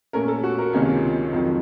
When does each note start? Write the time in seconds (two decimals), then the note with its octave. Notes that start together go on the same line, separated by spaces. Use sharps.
0.13 A#2 A3 C#4 A#4
0.28 A4
0.43 F#4
0.58 A#4
0.73 C#2 C3 D#3 A#3 C#4
0.88 F4
1.32 F2 D#3 F#3 F4